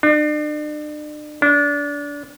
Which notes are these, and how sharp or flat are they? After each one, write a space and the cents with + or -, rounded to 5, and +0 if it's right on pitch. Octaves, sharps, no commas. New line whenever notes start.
D4 +40
D4 -25